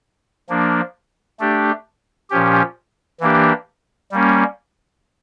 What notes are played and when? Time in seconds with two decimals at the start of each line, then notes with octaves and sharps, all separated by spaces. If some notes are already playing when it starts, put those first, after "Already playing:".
0.49 F3 A#3 D4
1.39 A3 D4 G4
2.30 A#2 F3 C#4 G4
3.21 E3 A#3 D4 G4
4.12 G3 A#3 C#4